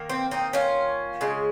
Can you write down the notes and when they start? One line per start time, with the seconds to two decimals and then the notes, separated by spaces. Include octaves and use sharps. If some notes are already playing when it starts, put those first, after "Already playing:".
Already playing: D#3 A#3
0.10 C4
0.31 C4 D#4
0.53 C#4 F4
1.21 C#3 G#3